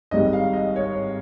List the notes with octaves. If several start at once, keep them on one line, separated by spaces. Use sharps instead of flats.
G#1 G#2 G3 D#5
F5
D#5
C#5